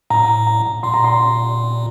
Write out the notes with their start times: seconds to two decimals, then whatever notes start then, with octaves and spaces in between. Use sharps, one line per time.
0.10 A2 A#5
0.47 A#5
0.83 A#2 C6
0.94 A#5
1.04 C6